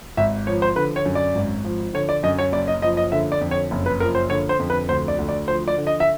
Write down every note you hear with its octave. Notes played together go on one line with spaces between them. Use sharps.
G#1 E5
F3 C#5
C5
D3 B4
C#5
F#2
D5
G#1
F3
D3 C#5
D5
F#2 D#5
C#5
F#1 D5
D#5
F3 D#5
D#5
D3 E5
D5
F2
C#5
F#1
B4
F3 A#4
C5
D3 C#5
C5
F2
B4
D2 C5
D5
D2
D5
F3 C5
D5
D3
D#5
E5